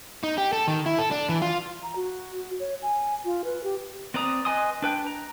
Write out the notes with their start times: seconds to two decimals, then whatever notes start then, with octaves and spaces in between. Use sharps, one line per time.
0.23 D#4
0.38 G4
0.53 A4
0.68 D#3
0.86 E4
0.99 A4
1.11 D4
1.29 E3
1.42 F4
1.83 A#5
1.96 F#4
2.60 C#5
2.82 G#5
3.25 F4
3.45 B4
3.64 G4
4.14 C4 B4 D5 A#5 D#6
4.45 B4 D#5 G#5 C6 D#6
4.82 D4 B4 G5
5.07 A#5